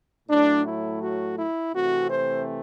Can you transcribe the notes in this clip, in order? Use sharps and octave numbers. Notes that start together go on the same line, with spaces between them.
A2 F#3 A3 D4
E4
F#4
E4
C3 E3 A3 C4 F#4
C5